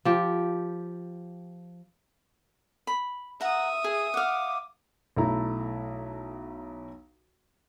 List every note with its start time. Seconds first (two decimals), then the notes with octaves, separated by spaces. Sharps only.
0.05 F3 G4
2.87 B5
3.41 E5 F#5 A#5 D#6
3.84 G#4
4.14 F5 F#5 D6
5.17 B1 A3 E4 A#5